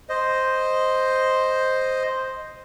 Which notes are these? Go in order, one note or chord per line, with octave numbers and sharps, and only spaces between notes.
C5 D#5